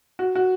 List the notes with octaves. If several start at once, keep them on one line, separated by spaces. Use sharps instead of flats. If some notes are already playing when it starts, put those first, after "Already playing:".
F#4
F#4